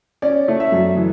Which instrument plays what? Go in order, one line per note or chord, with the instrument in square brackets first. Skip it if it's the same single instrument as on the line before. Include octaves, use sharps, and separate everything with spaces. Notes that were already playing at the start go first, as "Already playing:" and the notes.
[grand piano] C#4 D5
A3
E5
F#2
E3